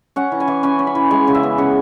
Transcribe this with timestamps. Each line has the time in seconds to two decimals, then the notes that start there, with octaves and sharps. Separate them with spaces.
0.16 C#4 F#5
0.32 E3
0.40 G#5
0.48 E3
0.63 C#4 G#5
0.79 C#4
0.87 B5
0.95 E3
1.11 G#3 G#5
1.27 C#3
1.35 E5
1.43 B3
1.58 C#3 F#5